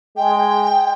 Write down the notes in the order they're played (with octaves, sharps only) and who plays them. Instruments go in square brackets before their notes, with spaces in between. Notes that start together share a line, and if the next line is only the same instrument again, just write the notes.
[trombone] G#3 [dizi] G5